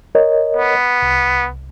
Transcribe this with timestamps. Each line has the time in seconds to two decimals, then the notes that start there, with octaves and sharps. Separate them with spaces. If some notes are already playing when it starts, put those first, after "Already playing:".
0.15 A#4 C#5 D#5
0.57 B3
1.02 C2